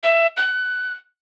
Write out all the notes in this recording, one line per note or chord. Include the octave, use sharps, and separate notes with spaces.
E5
F#6